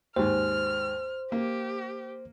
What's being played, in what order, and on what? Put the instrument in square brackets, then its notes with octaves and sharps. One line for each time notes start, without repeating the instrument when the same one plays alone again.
[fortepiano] D#2 G#2 [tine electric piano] C5 [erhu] F6
[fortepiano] A#3 [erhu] G4